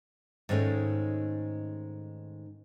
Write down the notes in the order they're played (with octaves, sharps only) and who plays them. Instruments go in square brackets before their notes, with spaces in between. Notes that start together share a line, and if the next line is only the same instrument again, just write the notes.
[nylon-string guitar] G#2 D#3 G#3 A3 C#4